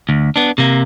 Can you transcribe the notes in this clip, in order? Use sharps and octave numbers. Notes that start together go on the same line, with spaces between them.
D2
B3 D4
C3 A#3